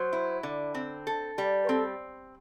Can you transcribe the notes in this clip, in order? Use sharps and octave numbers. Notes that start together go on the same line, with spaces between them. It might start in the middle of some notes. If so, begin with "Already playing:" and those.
Already playing: F#3 C5
E4
D3
C4
A4
G3
B4
C4 A4